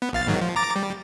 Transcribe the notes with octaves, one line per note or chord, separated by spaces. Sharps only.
B3
A#1 F5 A6
G#2 D#3 F#3
F3
A#5 D6 A6
G3